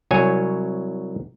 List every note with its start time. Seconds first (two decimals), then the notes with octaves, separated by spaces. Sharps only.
0.11 C2 F#3 C#5 G#5